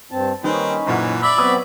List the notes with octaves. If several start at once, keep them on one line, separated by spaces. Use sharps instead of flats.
G2 C4 A5
D#3 G3 A#3 C4 C#4 D#4 B4
F#1 A#2 E3 F#5
D5 E5 B5
F#3 B3 C4 B4 C#5 D#6